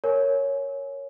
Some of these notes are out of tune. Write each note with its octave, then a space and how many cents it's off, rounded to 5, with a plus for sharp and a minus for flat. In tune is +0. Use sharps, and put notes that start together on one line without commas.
A#4 -10 C#5 +0 G#5 +25